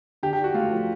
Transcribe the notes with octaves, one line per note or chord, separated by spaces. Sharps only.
D3 G4
G4
D4
F#4
A3 F4
F3